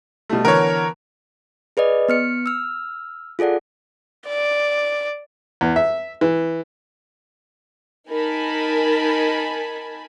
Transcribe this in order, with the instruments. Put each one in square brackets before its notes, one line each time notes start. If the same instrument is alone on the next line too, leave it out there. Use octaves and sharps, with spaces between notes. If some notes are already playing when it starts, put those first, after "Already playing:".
[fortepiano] B2 G3 A3
[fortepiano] D3 E3 B3 [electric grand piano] A#4 C#5
[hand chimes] G#4 B4 D5 D#5
B3 F6 C#7
E6 F6
F4 G#4 A4 D5 F#5
[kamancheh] D5
[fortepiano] E2
E5
E3
[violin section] D#4 A#4 G#5 A5 B5